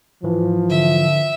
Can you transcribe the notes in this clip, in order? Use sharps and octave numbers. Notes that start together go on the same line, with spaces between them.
G#2 E3 F3
D3 E5